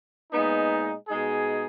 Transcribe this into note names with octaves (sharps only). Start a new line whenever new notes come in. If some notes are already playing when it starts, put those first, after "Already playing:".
A#2 G#3 B3 D#4
B2 G#3 D#4 G#4